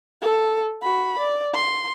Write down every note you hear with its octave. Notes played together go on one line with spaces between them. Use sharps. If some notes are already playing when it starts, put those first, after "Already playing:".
A4
F#4 B5
D5
C6